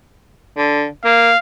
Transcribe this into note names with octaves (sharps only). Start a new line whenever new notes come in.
D3
A#3 F5